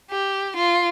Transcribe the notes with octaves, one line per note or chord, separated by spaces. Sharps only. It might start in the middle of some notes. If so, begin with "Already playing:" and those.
G4
F4